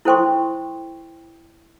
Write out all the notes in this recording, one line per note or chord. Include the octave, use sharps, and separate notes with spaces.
E4 A4 C5 G5 C6 C#6